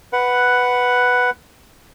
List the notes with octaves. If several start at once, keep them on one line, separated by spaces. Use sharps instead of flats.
B4 F#5